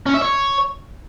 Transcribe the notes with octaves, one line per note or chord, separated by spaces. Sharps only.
C#4
E5
C#5